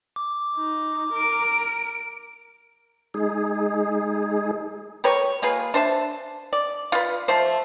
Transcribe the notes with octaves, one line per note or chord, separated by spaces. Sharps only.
D6
D#4
A#4 D7
G#3 D#4 G#4
G4 A#4 B4 C#5
A#3 F4 G#4 B4
D4 C5 E5 A5
D5
F4 B4
F3 A3 C5